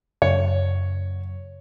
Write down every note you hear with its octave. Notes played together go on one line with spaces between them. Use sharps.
F#2 C#3 C#5